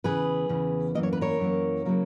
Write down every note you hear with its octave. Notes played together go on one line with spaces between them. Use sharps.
E2 C#3 E3 G#4 B4
E2 C#3 E3
F#2 E3 A#3 D#5
C#5
B4
A#4 C#5
F#2 E3 A#3
C#3 F#3 A#3